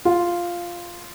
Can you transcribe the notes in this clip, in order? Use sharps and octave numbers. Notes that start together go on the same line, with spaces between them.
F4